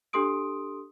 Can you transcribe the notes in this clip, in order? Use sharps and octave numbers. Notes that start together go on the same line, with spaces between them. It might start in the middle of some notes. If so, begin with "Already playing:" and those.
D4 G4 A4 C6 D#6 D7